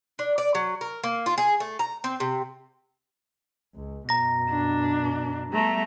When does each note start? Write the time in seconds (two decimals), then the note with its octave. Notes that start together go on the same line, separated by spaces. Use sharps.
0.19 D4
0.38 D5
0.55 F#3
0.81 A#4
1.04 A#3
1.26 F4
1.38 G#4
1.60 A3
1.79 A#5
2.04 C4
2.20 C3
3.75 C#2
4.09 F#2 B2 A#5 A#6
4.49 D4
5.53 G3 A3 B3 A#5